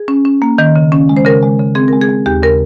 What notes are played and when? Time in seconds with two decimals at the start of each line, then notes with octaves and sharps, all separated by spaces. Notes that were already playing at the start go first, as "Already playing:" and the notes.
Already playing: G#4
0.08 C#4
0.25 C#4
0.42 A#3
0.58 D#3
0.76 C#3
0.92 C#4
1.09 G#3
1.17 C5
1.25 C#3 A#4
1.42 G#3
1.59 C#3
1.75 C4 G#4
1.88 G#3 A#4
2.01 G#4
2.09 G#3
2.26 D#2 G4
2.43 C#3 A#4